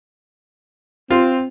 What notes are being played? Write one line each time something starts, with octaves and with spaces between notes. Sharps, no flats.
C4 F4